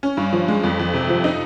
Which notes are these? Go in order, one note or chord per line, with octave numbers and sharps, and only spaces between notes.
C#4
G2
F3
G#3
F2
F2
C3
F3
D#4